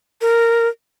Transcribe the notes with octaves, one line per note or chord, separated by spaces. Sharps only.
A#4